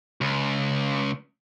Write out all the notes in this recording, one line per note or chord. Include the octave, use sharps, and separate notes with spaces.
C#2